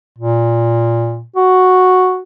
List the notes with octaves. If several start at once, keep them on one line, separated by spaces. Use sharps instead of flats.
A#2
F#4